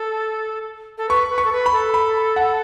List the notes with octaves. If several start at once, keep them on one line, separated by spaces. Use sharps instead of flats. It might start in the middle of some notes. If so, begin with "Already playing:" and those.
Already playing: A4
A4
B4 C#6
B4
C#6
A4
B4
B5
A4
B5
F#5